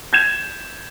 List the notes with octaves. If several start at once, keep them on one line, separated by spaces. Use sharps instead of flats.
G6 G#6 E7